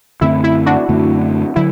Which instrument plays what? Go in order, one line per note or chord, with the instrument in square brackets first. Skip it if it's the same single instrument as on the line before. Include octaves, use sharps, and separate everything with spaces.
[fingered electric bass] F#2 D3 A3 C4 [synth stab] E4
[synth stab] E4
D4 F#4
[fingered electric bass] F#2 D3 A3 C4
[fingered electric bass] D3 F#3 [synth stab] E4